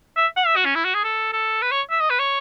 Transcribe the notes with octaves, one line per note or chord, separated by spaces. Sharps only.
E5
F#5
E5
F#4
C#4
E4
F#4
G#4
A4
A4
B4
C#5
E5
D#5
B4
C#5